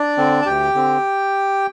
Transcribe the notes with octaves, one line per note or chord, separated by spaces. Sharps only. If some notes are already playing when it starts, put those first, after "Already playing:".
Already playing: D4 D5
D3 C4
A5
D2 G4 G5
D3 C4